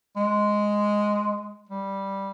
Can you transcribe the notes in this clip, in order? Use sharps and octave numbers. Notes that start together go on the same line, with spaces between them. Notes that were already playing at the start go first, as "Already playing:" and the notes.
G#3
G3